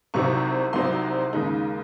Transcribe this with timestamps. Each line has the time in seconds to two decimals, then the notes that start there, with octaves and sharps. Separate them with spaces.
0.14 C2 C3 F#3 C4 D#4 C#6
0.73 C2 C3 F#3 C4 D#4 C6
1.33 D#2 C#3 G#3 D#4